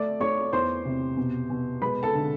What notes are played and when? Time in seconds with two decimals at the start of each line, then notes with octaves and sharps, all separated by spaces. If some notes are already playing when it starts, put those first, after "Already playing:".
Already playing: A3 D5 D6
0.21 A3 C#5 C#6
0.53 E2 C5 C6
0.85 C3
1.17 B2
1.50 B2
1.82 G#3 B4 B5
2.03 A4 A5
2.14 D3